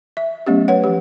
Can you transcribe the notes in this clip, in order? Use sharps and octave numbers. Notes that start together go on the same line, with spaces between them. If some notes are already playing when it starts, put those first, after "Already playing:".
E5
F#3 A3 B3 C#4 G4
B4 C#5 F#5
F3 G4